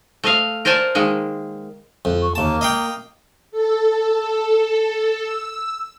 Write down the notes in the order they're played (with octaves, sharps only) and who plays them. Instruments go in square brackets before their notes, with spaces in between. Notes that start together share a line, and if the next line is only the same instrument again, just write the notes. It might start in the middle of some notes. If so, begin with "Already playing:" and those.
[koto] A3 D#5 F5
A#4 C5 D5 G#5 A5
D#3 G#3 A#3
[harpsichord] F2
[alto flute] C#6
[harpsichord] D#2 A5 [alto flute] A#3
[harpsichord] D#5 F5 G5
[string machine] A4
E6